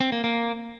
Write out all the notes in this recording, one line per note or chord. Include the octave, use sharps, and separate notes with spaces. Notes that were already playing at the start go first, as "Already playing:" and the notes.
C4
A#3
A#3